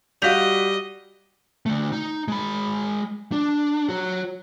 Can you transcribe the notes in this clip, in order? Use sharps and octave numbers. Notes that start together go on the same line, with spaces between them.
G3 F#4 D5 D#5 F5 G6 B6 F7
D3 A3
D#4
G#3 B5
D4
F#4 C#5